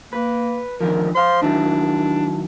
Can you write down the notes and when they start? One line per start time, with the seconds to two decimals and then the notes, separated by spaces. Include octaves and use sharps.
0.13 A#3 B4
0.81 D3 D#3 F3 A#4
1.15 C5 F5 C6
1.42 D#3 F#3 D4 E4